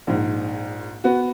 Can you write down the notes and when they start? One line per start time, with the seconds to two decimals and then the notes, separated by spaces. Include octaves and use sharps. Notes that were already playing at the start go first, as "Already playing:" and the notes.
0.07 A#1 G#2
1.04 B3 F#4